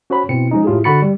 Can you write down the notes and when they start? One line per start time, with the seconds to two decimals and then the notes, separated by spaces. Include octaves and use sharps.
0.10 C#4 F#4 C5 C#5 B5
0.29 B2 C4 E4 C#7
0.51 F3 G#3 C#4 D#4
0.64 A2 F4 G4 G#4
0.84 D3 F#4 B5 A6 C#7
1.02 G3